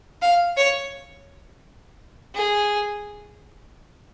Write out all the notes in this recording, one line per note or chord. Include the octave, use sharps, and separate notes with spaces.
F5
C#5
G#4